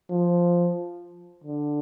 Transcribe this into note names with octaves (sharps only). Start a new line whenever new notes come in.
F3
D3